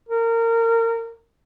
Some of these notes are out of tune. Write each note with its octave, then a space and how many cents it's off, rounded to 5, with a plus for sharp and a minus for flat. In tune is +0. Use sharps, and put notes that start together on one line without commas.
A#4 -25